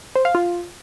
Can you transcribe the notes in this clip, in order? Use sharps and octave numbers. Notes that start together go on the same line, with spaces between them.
C5
F5
F4